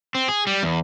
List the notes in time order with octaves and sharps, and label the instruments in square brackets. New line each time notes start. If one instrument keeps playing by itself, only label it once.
[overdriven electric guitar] C4
G#4
G3
E2